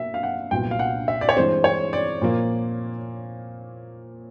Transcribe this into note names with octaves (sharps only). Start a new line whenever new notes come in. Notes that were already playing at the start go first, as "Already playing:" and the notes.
Already playing: B2 F#3 A#3 E5
F5
F#5
C2 A#2 F#3 B3 G5
F5
F#5
E5
D5
C#5
G2 E3 G#3 C4 C5
C#5
D5
A#2 F3 A#3